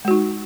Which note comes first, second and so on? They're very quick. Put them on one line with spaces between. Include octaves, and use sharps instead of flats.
G#3 F#4 D#4